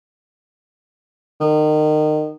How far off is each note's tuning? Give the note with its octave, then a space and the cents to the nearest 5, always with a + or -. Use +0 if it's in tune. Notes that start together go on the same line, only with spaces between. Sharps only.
D#3 -25